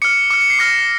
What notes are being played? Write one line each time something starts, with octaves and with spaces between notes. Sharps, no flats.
D6 F6 C#7
D6 F6 C#7
C#7
C7
D6 F6 A#6